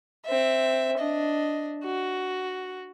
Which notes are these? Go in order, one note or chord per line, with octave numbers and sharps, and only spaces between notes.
C4 E5
D4 D#5
F#4